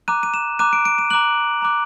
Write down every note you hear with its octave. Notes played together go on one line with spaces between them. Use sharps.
A#5 D6 F#6 D#7
D#7
E7
A#5 D6 F#6 D#7
D7
D7
D#7
A#5 D6 F#6 F#7
A#5 D6 F#6